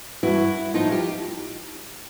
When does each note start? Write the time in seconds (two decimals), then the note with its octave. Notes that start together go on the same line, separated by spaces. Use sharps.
0.23 G2 E3 E4 F#4
0.74 A2 F3 D#4 F4
0.91 F4 G4